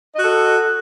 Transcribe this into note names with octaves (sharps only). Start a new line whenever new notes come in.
F#4 A4 D#5